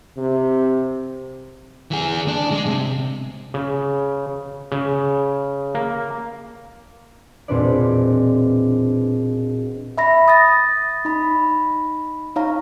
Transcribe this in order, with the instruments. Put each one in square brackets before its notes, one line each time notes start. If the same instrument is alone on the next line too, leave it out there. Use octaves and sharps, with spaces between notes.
[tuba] C3
[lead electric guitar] E3 G#4
D4
G#3
C3
[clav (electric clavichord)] C#3
C#3
A#3
[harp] E1 A#2 C4 D4 B4 D5
[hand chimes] E5 B5 A#6
D#6 A6 A#6
D#4 B5
D#4 C#5 F5 A#5